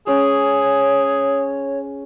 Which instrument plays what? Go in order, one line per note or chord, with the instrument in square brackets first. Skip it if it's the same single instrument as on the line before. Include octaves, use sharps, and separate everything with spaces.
[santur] G#3 C#4 [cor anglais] G#4 [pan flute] C#5